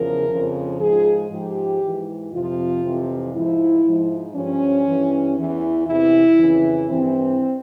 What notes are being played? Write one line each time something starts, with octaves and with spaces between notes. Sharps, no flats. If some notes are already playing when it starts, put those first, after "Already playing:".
Already playing: E2 C#3 F3 A#4
F2 C#3 F3
G#2 F3 G#4
G#2 F3 G4
G#2 E3
F2 C3 F3 F4
F2 C3 E3
G#2 F3 E4
G#2 F3
G2 F3 C#4
G2 E3
E2 E3
E2 C3 E3 E4
F2 C#3 E3
G2 E3 C4